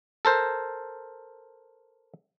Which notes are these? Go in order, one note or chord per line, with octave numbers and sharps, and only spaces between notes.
A4 A#4 C5